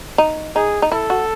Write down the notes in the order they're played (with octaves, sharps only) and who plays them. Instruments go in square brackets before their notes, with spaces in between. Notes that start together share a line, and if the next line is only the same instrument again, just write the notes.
[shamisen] D#4
[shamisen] D#4 [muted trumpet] G#4
[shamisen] D#4
[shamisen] E4 [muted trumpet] A4
[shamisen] F#4